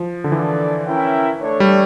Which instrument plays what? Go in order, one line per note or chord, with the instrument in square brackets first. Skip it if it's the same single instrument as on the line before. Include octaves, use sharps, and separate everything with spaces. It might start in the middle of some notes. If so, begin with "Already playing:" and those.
Already playing: [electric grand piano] F3
D3
[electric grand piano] E3 [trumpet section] A#3 D4 A4 D5
[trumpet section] C#4 E4 A#4 E5 G5
A3 D4 A4 C#5
[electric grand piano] G3